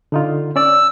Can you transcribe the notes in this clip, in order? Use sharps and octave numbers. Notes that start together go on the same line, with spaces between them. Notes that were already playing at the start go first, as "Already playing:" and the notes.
D3 D#4 F4
C#4 D5 E6